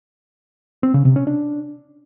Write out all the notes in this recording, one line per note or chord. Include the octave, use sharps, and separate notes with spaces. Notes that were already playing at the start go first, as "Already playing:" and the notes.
C4
C#3
C3
C#4
D4